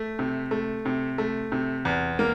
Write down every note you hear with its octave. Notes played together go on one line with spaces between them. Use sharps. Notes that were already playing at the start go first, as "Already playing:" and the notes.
Already playing: A3
C3
A3
C3
A3
C3
E2
A#3